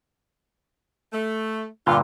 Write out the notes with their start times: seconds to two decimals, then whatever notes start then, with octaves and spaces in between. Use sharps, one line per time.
1.13 A3
1.87 G2 A#2 D3 A3 F4